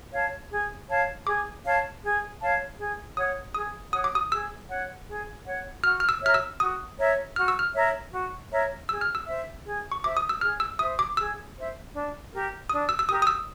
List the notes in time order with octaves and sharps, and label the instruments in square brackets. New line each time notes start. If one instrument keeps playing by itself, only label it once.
[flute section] C#5 F5 A5
G#4
C#5 F5 A5
[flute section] G#4 [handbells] D6
[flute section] C#5 F5 A5
G#4
C#5 F5 A5
G#4
[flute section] C#5 F#5 [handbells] D#6
[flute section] G#4 [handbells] D#6
[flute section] C#5 F#5 [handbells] D#6
[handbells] D6
D#6
[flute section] G#4 [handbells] E6
[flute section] C#5 F#5
G#4
C#5 F#5
[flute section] F#4 [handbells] F6
[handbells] F6
E6
[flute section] A#4 C#5 E5 [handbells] F6
[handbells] E6
[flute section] F#4 [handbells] D#6
[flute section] A#4 C#5 E5
[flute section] F#4 [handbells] F6
[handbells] E6
F6
[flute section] A#4 C#5 E5
F#4
A#4 C#5 E5
[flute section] G#4 [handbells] E6
[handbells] F6
E6
[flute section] C5 E5
G#4
[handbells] C#6
[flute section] C5 E5 [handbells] D6
[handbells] D#6
E6
[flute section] G#4 [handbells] F6
[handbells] E6
[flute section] C5 E5 [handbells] D#6
[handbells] D6
[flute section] G#4 [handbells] E6
[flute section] C5 E5
D4
G4 A#4
[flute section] D4 [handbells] D#6
[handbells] E6
E6
[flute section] G4 A#4 [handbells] D#6
[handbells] D#6
E6